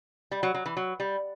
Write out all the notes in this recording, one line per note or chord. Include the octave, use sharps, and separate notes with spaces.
G3
F#3
F#3
E3
F#3
G3